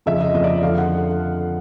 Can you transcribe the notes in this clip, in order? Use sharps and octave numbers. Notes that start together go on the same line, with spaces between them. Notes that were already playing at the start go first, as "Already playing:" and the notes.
F2 C#3 F3 E5
D#5
F2 C#3 F3 D#5
D5
F2 D3 F3 F5
F#5